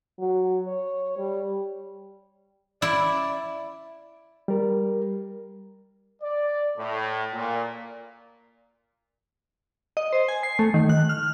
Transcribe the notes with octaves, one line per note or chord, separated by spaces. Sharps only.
F#3
C#5
G3
E4 D5
G3 A#4
D5
A2
A#2
D#5
C5
G#5
C7
A3
D#3
F#6
F6